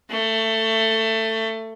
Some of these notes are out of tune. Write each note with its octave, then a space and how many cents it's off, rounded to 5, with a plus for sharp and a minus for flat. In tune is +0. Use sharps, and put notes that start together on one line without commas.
A3 +20